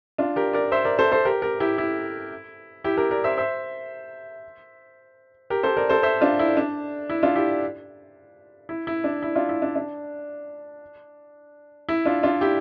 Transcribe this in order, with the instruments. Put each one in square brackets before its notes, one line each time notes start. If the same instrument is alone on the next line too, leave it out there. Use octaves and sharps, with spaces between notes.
[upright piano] D4 F4
G4 A#4
A#4 D5
C5 E5
A#4 D5
A4 C5
A4 C5
G4 A#4
G4 A#4
E4 G4
E4
E4 G4
G4 A#4
A#4 D5
C5 E5
C5 E5
G4 A#4
A4 C5
A#4 D5
A4 C5
C5 E5
D4 F4
E4
D4
E4
D4 F4
E4 G4
E4
E4
D4
E4
D4 F4
E4
D4
D4
E4
D4 F4
D4 F4
E4 G4